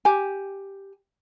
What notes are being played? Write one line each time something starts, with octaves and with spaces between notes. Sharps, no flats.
G4 G#5